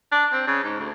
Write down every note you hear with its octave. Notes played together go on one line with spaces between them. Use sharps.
D4
C4
C#3
G#2
D2